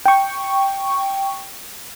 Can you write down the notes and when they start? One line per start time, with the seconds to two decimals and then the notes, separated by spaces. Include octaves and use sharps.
0.06 G5 C#6